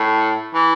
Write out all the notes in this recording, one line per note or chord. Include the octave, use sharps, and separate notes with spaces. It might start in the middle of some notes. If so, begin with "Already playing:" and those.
Already playing: A2
E3